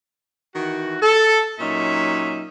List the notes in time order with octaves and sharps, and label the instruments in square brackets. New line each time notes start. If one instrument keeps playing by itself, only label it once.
[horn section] D#3 E3 F#4
A4
A#2 F#3 C#4 D#4 E5